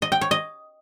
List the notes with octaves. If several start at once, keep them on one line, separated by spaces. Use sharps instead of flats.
D#5
G5
C#5
D#5